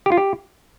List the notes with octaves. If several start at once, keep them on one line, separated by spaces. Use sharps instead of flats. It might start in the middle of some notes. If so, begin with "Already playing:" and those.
G4
F4
G4